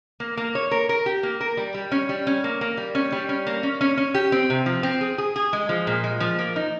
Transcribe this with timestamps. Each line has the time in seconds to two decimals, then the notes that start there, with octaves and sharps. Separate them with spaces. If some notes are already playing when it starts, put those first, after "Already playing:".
0.20 A#3
0.37 A#3
0.55 C#5
0.71 A#4
0.89 A#4
1.06 G4
1.23 A#3
1.41 A#4
1.57 G3
1.74 G3
1.92 C#4
2.09 G3
2.27 C#4
2.44 A#3
2.61 A#3
2.77 G3
2.95 C#4
3.12 G3
3.29 C#4
3.47 A#3
3.63 C#4
3.81 C#4
3.98 C#4
4.14 G4
4.32 C4
4.50 C3
4.66 F3
4.83 C4
5.01 G#4
5.18 G#4
5.36 G#4
5.53 G#3
5.69 F3
5.87 A#2
6.04 G#3
6.20 F3
6.39 A#3
6.56 D#4